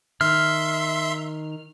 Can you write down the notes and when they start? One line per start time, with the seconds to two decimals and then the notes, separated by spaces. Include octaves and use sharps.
0.21 D#3 E5 C6 F6